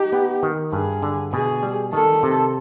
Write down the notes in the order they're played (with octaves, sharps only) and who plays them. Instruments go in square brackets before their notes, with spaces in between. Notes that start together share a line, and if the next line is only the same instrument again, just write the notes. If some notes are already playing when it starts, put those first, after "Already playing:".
Already playing: [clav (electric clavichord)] D#4 [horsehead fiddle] G4
[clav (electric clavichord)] B3
D#3
[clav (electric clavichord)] G2 [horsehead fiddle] G#4
[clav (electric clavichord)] D3
[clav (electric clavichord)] B2 [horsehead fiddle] G#4
[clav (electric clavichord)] G3
[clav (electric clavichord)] D#3 [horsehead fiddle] A4
[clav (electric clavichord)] C3